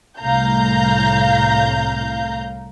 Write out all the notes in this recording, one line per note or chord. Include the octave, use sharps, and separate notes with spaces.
C2 A2 F5 A#5 G6